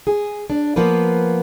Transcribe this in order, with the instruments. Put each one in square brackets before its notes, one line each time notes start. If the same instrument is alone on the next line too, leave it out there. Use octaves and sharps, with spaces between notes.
[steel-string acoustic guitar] G#4
D4
F3 A#3 B3 B4